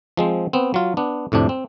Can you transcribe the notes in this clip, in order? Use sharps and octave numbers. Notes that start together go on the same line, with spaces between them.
F3 G#3 C4
B3 C4
F#3 F4
B3 D4
F2 A2 C3 D4
C4